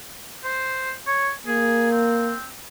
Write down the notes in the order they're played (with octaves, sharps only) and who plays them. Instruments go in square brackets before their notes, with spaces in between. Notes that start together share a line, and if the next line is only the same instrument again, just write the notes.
[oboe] C5
C#5
[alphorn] A#3 [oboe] G#4
[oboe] C4